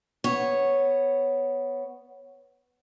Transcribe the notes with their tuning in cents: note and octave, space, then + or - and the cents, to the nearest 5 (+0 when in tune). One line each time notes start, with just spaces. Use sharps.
B3 +0 C#5 -5